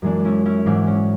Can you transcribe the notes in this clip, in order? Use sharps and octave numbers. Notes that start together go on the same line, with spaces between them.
F#2 E3 G#3 D4
D4
C#4 E4
C#4 E4
G#2 E3 G#3 D4
C#4